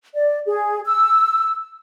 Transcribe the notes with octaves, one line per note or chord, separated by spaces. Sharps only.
D5
G#4
E6